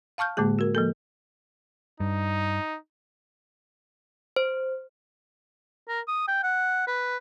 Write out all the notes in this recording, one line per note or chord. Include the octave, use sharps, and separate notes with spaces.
F5 A5 C#6 F6 G6
A2 D3 G#3 A#3 G#4
F#4 A#4
F3 A#3 A4
G2 D#4
C5
A#4
D#6
G5
F#5
B4